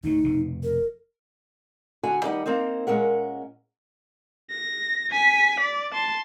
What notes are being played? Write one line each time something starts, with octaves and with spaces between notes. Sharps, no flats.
D2 A2 D#4
F1 B2
A#4
D3 F#4 G#5
D#2 G3 D#4 F#5
A#3 C4 D#4 C5
A#2 G#3 C#4 A#4 F#5
A#6
G#5 B6
D5
A5 C6